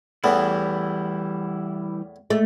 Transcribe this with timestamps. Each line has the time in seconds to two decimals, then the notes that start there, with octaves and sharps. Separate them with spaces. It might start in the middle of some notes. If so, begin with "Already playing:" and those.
0.24 E2 A2 E3 G3 B3 E4
2.30 A3